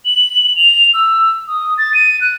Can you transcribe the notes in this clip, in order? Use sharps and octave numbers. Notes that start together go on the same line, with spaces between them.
F#7
F7
E6
D#6
A6
D#7
F#6